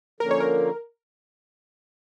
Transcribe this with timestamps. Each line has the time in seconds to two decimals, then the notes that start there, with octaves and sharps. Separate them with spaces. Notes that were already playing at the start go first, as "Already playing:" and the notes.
0.20 D3 F3 A#3 C#4 A#4
0.31 C#5
0.40 A#4